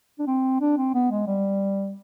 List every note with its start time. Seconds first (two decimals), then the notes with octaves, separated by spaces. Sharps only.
0.19 D4
0.27 C4
0.61 D4
0.78 C4
0.95 B3
1.11 G#3
1.27 G3